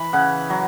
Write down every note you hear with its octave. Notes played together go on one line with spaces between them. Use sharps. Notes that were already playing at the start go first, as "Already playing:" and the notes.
Already playing: E3 B5
C#3 F#5
F#3